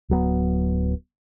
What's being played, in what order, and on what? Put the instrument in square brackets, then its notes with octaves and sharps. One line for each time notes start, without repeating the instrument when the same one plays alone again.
[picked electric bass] D1 F#3 B3